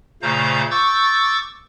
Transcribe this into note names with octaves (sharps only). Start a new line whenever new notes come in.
A#2 C#3 A3 C5 F5 A#5
C#6 D6 E6 G6 A6